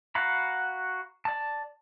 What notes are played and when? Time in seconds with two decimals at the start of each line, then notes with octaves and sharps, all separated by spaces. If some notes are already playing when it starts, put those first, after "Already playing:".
0.15 F#4 F5 F#5 A#5 B5
1.25 D5 A5